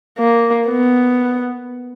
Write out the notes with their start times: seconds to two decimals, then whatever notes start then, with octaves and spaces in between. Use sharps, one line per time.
0.19 A#3
0.69 B3